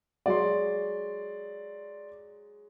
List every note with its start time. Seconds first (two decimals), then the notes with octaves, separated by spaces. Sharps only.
0.26 F#3 G#3 D5 F#5 C6